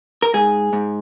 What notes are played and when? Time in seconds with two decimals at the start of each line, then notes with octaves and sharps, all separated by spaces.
0.22 A#4
0.34 G#2 G#4
0.73 G#2